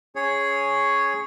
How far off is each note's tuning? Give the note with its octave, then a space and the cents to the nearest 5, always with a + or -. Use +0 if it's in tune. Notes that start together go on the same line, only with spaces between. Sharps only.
C#4 +0 G#4 +0 C#5 +0